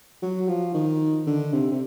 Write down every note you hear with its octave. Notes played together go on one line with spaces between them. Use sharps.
F#3
F3
D#3
D3
C3
C3